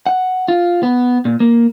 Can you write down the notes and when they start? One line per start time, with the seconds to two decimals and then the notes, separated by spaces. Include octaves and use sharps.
0.06 F#5
0.48 F4
0.83 B3
1.25 A#2
1.40 A#3